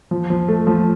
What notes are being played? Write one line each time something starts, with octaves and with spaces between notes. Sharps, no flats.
F3
F3
A3
F3